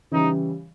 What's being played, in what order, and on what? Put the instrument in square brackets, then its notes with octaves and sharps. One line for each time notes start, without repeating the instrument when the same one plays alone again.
[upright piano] C#3 E3 G3 [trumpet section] D#4